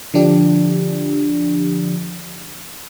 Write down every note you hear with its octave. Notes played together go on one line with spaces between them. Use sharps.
D3 F3 D4 G4